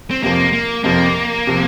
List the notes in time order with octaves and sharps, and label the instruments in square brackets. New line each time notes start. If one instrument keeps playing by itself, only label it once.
[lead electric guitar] C4
[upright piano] F2 C3 F3 [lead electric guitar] A#3
[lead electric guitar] A#3
[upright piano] F2 C3 F3 [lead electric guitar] A#3
[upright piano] C3 F3